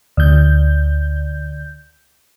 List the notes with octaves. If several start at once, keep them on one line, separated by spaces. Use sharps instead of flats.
D2 G6